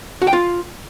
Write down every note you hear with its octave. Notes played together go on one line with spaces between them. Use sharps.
F#4
G5
F4